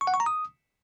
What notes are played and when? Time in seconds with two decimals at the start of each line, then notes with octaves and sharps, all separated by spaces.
0.01 C#6
0.07 F#5
0.14 C#6
0.20 A#5
0.26 D#6